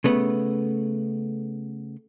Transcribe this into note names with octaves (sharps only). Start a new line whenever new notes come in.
C#3 A3 B3